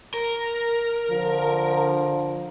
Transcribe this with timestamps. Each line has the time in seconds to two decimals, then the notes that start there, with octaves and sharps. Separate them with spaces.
0.14 A#4
1.09 D3 F3